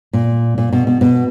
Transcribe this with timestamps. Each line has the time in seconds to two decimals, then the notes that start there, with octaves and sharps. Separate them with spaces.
0.13 A#2
0.58 A#2
0.73 B2
0.87 B2
1.01 B2